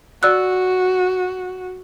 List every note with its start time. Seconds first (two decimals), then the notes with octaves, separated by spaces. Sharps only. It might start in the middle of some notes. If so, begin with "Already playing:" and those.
0.23 F#4 D5 E6 F#6